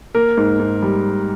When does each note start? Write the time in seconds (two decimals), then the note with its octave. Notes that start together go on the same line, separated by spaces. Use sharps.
0.15 A#3 A#4
0.37 G#2
0.60 G#2
0.82 G3